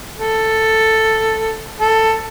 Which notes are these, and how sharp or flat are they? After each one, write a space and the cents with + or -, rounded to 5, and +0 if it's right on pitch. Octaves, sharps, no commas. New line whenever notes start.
A4 +5
A4 +10